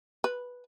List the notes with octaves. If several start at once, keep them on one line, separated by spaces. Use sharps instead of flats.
B4